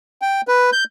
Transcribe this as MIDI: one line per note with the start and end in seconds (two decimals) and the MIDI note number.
0.22 0.41 79
0.48 0.70 71
0.73 0.84 91